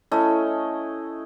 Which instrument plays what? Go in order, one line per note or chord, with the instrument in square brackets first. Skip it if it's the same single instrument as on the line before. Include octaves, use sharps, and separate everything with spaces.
[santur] A3 C#4 E4 D#5